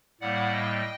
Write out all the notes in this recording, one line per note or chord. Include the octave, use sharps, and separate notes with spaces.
A2 G3 A#3 D5 F#5
D#5 G5